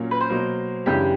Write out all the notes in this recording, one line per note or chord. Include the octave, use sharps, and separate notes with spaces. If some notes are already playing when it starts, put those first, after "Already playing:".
Already playing: A#2 F#3 A#3 C#4
B4
C5
B2 F#3 A#3
F#2 C#3 E3 A3 D4 G4